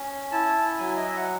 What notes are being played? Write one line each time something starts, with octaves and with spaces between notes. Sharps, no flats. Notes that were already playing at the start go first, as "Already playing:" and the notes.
Already playing: C#4
E4 A5
F#3 G#5
D#5
E5
F#5